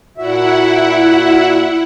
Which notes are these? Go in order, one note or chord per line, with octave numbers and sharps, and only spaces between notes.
A#2 E4 F#4 E5 F#5